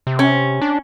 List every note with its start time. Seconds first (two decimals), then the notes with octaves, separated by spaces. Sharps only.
0.07 C3
0.19 C#4
0.62 D4